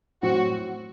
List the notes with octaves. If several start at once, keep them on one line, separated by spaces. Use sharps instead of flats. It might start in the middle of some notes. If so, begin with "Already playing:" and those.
A2 F#3 C4 F#4